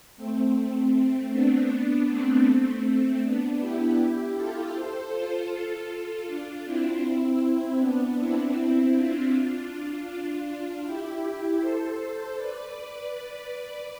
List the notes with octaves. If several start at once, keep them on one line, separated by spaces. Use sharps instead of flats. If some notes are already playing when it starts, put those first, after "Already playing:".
A3 C4
B3 D4
B3 D4
A3 C4
B3 D4
E4 G4
F4 A4
A4 C5
F4 A4
D4 F4
C4 E4
C4 E4
B3 D4
C4 E4
D4 F4
D4 F4
E4 G4
A4 C5
B4 D5